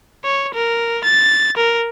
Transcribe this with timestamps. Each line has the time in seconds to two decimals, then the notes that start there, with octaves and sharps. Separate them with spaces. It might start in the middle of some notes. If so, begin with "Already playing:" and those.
0.25 C#5
0.55 A#4
1.04 A6
1.57 A#4